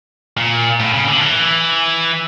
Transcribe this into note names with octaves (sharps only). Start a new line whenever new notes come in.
A#2
A2
C#3
D3
E3